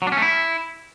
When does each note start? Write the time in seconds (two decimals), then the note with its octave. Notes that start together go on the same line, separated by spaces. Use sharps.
0.02 F#3
0.07 D4
0.12 C#4
0.17 A3
0.22 E4